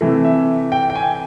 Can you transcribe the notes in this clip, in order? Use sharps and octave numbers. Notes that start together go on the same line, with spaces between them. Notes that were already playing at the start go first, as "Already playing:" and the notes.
C3 E3 A3
E5
G5
G5
G#5